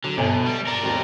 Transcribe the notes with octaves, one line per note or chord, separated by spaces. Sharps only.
D3 F#3
G1 B2 G#5
A5
G3
A#4 D5
G#1 D#2